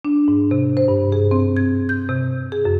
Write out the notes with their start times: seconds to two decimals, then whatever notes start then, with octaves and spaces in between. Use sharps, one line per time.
0.05 D4
0.28 G#2
0.51 C3
0.77 C5
0.88 G2
1.12 G#4
1.31 C4
1.57 G#6
1.89 G6
2.09 C3
2.52 G#4
2.65 F#2